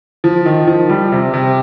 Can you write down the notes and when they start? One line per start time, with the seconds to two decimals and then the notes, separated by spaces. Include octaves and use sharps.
0.24 F3
0.46 D#3
0.67 F3
0.89 G3
1.12 C3
1.34 C3